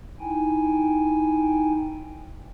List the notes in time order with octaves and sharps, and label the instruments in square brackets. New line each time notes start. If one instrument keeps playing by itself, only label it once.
[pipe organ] D#4 E4 G5 G#5